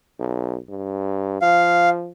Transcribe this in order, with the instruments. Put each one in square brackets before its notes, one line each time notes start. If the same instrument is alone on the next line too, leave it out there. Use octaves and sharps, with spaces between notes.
[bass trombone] B1
G2
[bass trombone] F3 [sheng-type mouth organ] F5